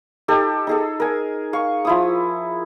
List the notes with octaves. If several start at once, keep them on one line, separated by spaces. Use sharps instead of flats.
D#4 G4 A4
D#4 G#4 A4
A#4 G#5
F5 C#6
F3 E4 D#6